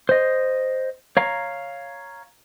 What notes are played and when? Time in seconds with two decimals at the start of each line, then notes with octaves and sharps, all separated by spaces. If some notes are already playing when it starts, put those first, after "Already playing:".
0.09 C5 D#5
1.17 C#5 F5 A#5